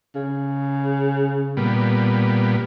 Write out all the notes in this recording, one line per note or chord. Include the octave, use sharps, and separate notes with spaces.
C#3
A#2 G3 B3